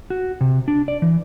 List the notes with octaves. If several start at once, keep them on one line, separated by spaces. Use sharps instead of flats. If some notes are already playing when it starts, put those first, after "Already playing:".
F#4
C3
D4
D5
E3